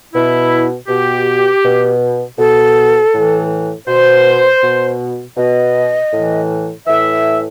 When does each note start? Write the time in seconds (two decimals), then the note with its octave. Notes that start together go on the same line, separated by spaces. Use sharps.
0.14 B2 E4
0.88 B2 G4
1.63 B2
2.38 B2 A4
3.13 A2 E3
3.87 B2 C5
4.62 B2
5.36 B2 D#5
6.12 A2 E3
6.86 A2 E3 E5